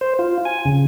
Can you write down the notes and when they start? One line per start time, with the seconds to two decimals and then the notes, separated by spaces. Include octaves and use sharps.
0.01 C5
0.19 F4
0.45 G#5
0.65 C#3